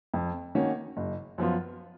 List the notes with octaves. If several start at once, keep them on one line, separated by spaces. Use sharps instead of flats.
F2
D#3 A#3 C#4 F#4
F#1
F#2 F3 B3 F4